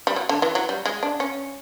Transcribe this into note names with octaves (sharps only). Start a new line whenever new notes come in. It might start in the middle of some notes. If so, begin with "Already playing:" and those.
G3
F#3
D3
E3
F#3
G3
G#3
D4
C#4